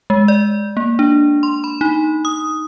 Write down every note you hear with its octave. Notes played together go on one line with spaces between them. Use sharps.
G#3
D5
A#3
D4
C6
B5
D#4
D#6